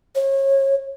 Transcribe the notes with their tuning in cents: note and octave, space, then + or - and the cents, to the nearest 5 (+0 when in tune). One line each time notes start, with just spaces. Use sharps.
C#5 -30